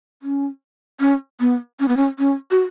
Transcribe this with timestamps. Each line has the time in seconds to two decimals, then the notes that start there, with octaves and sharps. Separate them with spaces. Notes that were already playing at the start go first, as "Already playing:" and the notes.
0.22 C#4
1.00 C#4
1.40 B3
1.80 C#4
1.88 B3
1.97 C#4
2.19 C#4
2.51 F#4